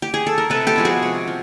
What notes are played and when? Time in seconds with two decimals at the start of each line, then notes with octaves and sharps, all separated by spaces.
0.02 G4
0.14 G#4
0.27 A4
0.38 A#4
0.50 C3 A4 B4
0.67 G4 A4
0.76 F3 G#3 B3
0.85 F#4 G#4
1.02 C3
1.27 F3